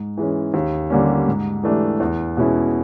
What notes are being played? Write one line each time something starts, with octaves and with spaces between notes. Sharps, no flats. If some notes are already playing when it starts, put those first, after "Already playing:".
Already playing: G#2
E3 G#3 C#4
D#2
D3 G3 A#3 C#4
G#2
E3 A3 D4 G4
E2
B2 G#3 C#4 E4